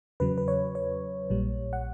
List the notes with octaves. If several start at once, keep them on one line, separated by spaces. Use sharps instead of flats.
E2 C#3 F#3 B4
B4
C#5
C#5
A#1 A#2 G3
F#5